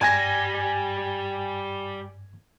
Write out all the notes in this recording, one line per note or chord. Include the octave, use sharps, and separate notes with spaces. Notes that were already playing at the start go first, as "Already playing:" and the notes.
G2 G3 D5 G#5 G#6 A#6